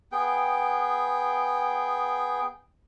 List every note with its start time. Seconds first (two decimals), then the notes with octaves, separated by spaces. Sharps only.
0.12 B3 G#4 G5